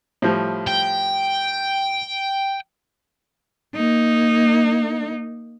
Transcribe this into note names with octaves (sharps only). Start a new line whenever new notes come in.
A2 F3 G3
G5
A#3 D#4